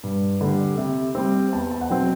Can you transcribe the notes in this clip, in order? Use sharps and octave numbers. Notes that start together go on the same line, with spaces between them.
G2
D3 G3
C3
G3 C4
E2 A5
A5
F#5
B2 F#3 C4 G5